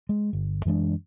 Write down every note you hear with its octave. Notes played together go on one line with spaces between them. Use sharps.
G#3
G1
F#2 E3 G#3 D4